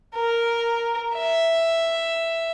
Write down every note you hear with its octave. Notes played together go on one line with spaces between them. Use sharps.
A#4
E5